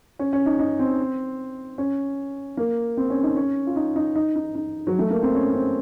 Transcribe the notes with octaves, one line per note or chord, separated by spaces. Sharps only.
C#4
C#4
D#4
D#4
C4
C#4
A#3
C4
C#4
D#4
C#4
F4
D#4
D#4
D#4
D#4
D#4
F#3
A3
A#3
C4
C#4
C4